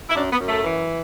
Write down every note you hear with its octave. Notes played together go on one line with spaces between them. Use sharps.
E4
F#2 D4
B3
F#2
A3
E3